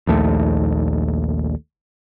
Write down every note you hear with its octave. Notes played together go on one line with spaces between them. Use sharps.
A#1 D#2 A3